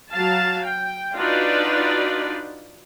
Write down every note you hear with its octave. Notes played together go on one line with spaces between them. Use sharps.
F#3 F5 A5
G5
D4 D#4 F4 F#4 B4 D5